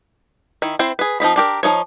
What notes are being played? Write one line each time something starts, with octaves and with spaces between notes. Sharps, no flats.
D#3 E4
C4 E4 C5
G#4 B4
F3 C4 D#4 B5
D4 G4 A#4
F3 A#3 D#4 C#5